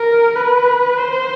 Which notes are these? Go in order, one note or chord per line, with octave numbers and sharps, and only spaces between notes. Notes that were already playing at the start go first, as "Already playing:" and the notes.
Already playing: A#4
B4
C5